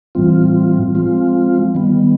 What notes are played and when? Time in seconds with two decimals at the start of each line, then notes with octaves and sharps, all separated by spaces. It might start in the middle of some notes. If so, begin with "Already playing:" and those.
0.15 A2 E3 G3 C4 F4
0.95 F3 G#3 C4 F4
1.75 D#3 G3 B3